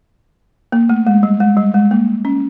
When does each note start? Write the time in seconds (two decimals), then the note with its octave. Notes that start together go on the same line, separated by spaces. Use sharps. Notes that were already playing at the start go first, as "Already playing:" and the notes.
0.72 A#3
0.89 A3
1.07 G#3
1.23 G3
1.40 G#3
1.57 G3
1.74 G#3
1.91 A#3
2.25 C#4